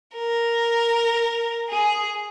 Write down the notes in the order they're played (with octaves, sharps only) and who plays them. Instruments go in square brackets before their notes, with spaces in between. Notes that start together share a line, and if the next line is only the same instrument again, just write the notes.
[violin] A#4
G#4